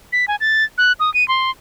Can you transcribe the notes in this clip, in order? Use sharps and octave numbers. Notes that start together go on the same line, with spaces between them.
B6
G#5
A6
F#6
D#6
D#7
C6